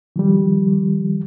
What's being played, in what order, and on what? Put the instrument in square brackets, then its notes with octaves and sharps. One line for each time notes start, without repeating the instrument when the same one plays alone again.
[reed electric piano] D#3 F3 G3